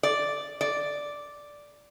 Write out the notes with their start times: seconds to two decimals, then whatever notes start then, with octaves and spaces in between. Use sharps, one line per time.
0.03 D5
0.61 D5